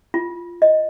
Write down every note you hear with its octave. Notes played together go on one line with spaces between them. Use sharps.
F4
D#5